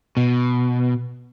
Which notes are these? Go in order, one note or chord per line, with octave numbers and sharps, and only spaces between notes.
B2